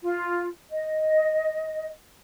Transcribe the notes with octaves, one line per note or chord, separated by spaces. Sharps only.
F4
D#5